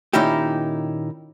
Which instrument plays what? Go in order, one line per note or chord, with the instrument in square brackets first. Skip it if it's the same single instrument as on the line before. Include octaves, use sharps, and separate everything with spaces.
[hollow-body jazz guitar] A#2 D#3 C#4 D#4 E4 G4